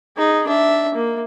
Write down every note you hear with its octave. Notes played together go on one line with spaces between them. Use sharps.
D#4 G#4
D4 E5
A#3